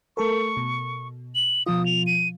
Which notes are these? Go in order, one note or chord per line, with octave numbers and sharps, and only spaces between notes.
A3 A4 A#4 C#6
B2
F#7
B2 F3 F4 D#6
F7
D#7